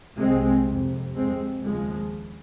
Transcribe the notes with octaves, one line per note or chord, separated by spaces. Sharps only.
C2 C3 G#3 C4
F2 C3
F2 C3 G#3 C4
D#2 C#3 F3 G#3